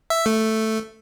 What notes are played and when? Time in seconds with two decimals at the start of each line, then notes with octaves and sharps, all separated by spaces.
0.10 E5
0.26 A3